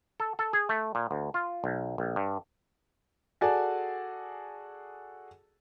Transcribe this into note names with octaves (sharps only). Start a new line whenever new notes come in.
A4
A4
G#4
A3
A#2
D2
F4
B1
A#1
G2
F#4 G#4 A4 D5 G#5 A5